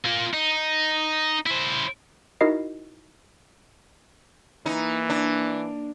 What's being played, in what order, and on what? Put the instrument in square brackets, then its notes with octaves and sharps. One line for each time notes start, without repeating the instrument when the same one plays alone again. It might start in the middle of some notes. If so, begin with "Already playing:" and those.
[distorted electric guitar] A#3 F4
D#4
E4 C5
[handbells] D#4 E4 F#4 A#4 D#5 C7
[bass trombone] E3 [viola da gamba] A#3 [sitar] D#4
[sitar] D4